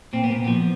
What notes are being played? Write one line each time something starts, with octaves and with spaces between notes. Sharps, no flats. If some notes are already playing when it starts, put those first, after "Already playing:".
A#2 C4
B3
A#2
F3 B3